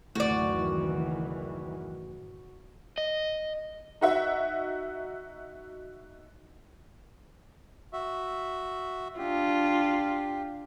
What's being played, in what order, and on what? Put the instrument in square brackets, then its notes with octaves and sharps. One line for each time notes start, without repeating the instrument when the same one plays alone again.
[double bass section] F#1 D#3 E3 [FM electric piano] D2 A2 [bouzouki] F#4 D5
[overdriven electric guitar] D#5
[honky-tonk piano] D#4 F#4 E5
[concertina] F#4 E5
[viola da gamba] D4 F4 [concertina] G4